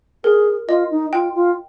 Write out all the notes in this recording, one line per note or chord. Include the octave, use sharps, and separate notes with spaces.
G#4 A#4
F4 D#5
D#4
F4 G5
F4